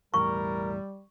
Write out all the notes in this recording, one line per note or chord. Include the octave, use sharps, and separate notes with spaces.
E1 E2 A2 G3 A#4 C#6